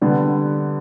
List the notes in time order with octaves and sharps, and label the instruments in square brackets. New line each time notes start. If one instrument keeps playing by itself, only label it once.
[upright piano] D3 G3 B3